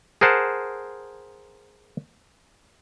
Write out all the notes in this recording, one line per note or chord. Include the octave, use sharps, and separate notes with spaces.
G#4 A#4 C5 F#5 A5